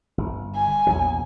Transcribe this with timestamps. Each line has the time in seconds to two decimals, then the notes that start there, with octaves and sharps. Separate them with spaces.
0.18 G1
0.55 G#5
0.87 A#1 E2 F#3